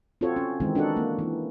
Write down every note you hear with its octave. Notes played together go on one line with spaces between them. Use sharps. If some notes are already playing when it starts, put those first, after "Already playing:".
C4 F4 F#4 A4 C5 C#5
C#4
D#3 E3 G#3 C4 D#4
D4 D#4 F#4 A4 F#5
A#3
E3